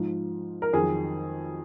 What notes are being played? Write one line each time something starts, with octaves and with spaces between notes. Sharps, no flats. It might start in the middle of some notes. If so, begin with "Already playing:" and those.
Already playing: G#2 F3
A#4
F2 D#3 F#3 G#4